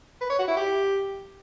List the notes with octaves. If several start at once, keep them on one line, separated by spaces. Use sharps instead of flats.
B4
C#5
F#4
E4
G4